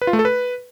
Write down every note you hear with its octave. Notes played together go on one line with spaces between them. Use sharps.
B4
F4
A3
A4
B4